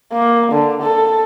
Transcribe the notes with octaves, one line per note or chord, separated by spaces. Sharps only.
A#3
D3
A4